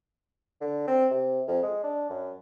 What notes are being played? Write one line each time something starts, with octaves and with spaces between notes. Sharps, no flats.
D3
C4
C3
F2
G#3
D4
F#2